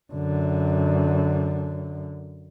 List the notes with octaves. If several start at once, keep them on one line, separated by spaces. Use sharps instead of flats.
F#2 D3